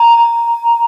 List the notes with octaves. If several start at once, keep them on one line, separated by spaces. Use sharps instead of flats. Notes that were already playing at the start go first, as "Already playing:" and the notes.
Already playing: A#5